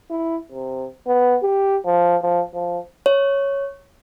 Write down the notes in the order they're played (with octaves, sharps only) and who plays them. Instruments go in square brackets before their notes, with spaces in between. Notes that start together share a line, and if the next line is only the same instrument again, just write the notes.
[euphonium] E4
C3
B3
G4
F3
F3
F3
[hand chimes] C#5